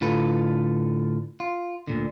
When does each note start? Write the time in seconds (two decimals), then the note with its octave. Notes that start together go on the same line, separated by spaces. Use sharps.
0.01 A2 D3 F4 A4 B4
1.40 F4
1.88 D2 A#2 D3